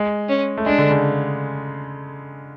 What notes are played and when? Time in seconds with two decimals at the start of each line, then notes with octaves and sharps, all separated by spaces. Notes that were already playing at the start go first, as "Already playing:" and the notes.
Already playing: G#3
0.29 C#4
0.57 A3
0.66 G#3 D4
0.78 D3
0.91 C#3